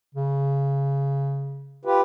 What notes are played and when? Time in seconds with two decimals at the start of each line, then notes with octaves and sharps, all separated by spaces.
0.15 C#3
1.85 F4 G4 B4